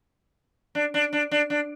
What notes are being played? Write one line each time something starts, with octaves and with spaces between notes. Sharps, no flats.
D4
D4
D4
D4
D4